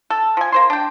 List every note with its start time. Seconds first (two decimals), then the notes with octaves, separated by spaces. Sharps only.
0.10 A4
0.37 F3 G#5
0.52 A#3 C5 C6
0.70 D4 G5